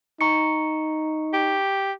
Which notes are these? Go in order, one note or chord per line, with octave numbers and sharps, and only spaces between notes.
D#4 A#5 C#6 C#7
G4